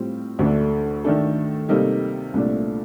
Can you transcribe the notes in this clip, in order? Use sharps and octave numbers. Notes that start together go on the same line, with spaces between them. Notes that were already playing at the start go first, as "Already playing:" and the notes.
Already playing: A2 G3 C4 F4
D2 D3 A3 D4
D#3 A3 D4 A4
C3 G3 A#3 D#4 A4
C2 A#2 A3 D4